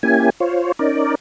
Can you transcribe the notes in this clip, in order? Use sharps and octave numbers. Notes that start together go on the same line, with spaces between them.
A#3 C#4 E4 G4 G#5
F4 C5 C#5
C#4 D#4 A#4 D5